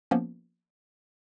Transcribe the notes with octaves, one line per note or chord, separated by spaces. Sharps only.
F3 A#3 B3 C#4